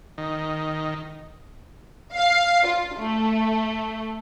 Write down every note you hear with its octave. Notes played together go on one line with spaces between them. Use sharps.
D#3
F5
F4
A3